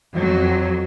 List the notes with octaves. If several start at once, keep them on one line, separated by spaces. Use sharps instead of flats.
F2 F#3